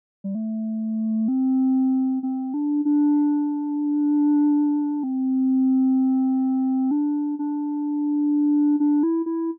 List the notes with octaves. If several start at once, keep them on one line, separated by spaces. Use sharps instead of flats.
G3
A3
C4
C4
D4
D4
C4
D4
D4
D4
E4
E4